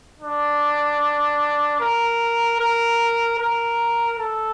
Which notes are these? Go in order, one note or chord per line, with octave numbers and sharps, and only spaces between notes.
D4
A#4
A#4
A#4
A4